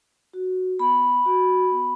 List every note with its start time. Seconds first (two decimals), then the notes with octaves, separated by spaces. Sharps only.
0.33 F#4
0.79 B3 B5
1.26 F#4
1.71 B3